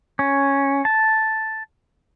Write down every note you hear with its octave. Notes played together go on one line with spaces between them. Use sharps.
C#4
A5